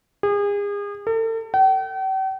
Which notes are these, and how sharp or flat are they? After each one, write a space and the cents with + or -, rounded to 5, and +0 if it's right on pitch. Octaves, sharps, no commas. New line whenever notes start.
G#4 -35
A4 +40
G5 -45